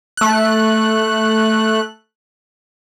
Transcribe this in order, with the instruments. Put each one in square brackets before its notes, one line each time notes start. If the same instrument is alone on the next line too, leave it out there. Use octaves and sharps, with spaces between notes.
[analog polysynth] A3 F#6